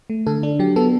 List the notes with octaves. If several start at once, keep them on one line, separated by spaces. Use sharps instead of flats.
A3
D3 A4
D4
F#3 G4
B3 A4